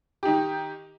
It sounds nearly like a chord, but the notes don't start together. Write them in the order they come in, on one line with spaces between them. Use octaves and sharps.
G4 D#4 D#3